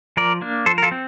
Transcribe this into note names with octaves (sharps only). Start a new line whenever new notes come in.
F3 A#4 D5
A#3 D4
F3 A4 C5
A#4
F4 A4
C4